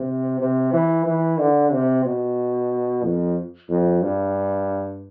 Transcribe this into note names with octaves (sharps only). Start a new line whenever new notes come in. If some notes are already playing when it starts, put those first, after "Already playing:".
Already playing: C3
C3
E3
E3
D3
C3
B2
F2
F2
G2